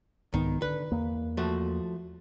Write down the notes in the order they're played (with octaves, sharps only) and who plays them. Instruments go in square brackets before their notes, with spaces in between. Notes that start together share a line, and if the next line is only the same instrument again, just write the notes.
[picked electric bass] C2 G#2 B3 [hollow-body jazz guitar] D#3
[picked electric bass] D3 [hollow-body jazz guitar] B4
[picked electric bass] E2 A#3
[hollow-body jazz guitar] F3 A3 F#4